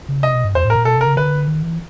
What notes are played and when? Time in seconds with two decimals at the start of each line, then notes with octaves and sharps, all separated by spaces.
0.08 C#3
0.23 C3 D#5
0.34 B2
0.44 G2
0.55 E2 C5
0.65 A2
0.70 A#4
0.75 A#2
0.85 B2 A4
0.96 C3 A#4
1.06 C#3
1.17 D3 B4
1.47 D#3
1.62 E3